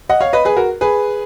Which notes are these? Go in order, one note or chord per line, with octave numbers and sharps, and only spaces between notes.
D#5 F#5
C#5 F5
B4 D#5
G#4 B4
F#4 A#4
G#4 B4